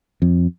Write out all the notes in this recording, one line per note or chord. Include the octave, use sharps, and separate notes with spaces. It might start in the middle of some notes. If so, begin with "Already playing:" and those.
F2